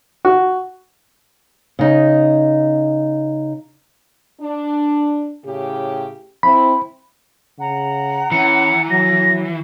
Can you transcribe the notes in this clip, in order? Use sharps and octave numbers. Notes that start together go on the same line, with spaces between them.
F#4
C#3 D#4
D4
A2 C#3 G4
C4 E4 B5
C#3 F#5 A#5
E3 C#4 C#7
F#3 A#6